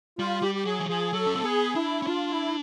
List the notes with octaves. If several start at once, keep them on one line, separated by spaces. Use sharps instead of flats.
G3 F4
G3 G4
G4
F#3 G#4
E3
F3 G#4
F#3 A4
C#4
C4
B3 G#4
D4 E4
C#4
D4 F4
E4